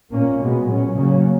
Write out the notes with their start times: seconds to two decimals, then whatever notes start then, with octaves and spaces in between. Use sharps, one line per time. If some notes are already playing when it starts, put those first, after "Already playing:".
0.11 A#2 A#3 C#4
0.39 B2 G#3 B3
0.67 A#2 F#3 C#4
0.95 C#3 F#3 A#3 C#4